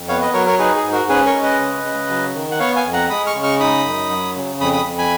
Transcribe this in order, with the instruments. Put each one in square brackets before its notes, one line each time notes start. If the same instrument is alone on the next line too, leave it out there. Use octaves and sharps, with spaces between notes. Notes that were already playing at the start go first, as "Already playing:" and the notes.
Already playing: [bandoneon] F2
B3 C#5 F5
B4 D#5
F#3 A#4 C#5
A#4 C#5
D#4 G#4 B4
G#4
G#2
F#4 A#4
C#4 G#4 B4
A#4 C#5
G#3
B4 D#5
C#3
C#3
F#3
D#3
F#5
B3 C#5 F5
F5 G#5
F2
F#5 A#5
G#3 B5 D#6
C#6 F6
C#3
C#6 F6
D#4 B5 D#6
F#2
F#3
C#3
F2 B5 D#6
B5 D#6
F2
G#5 B5